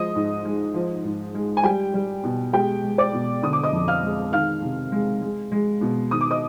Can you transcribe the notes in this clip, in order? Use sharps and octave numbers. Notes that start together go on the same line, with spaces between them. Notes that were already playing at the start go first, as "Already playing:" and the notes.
Already playing: F3 G#3 D#5 D#6
G#2
G#3
F3
G#2
G#3
G#5
G3 G4 G5
G3
B2
G#3 G4 G5
G#3
D5 D6
B2
D3 D#6
D6
D#5 D#6
F2
F5 F6
G#3
D#3 F5 F6
C3
G#3
G#3
G#3
B2
D#3 D#6
D6
D#5 D#6